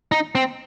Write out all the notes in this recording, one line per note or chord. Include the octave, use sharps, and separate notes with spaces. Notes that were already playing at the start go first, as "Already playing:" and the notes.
D#4
C4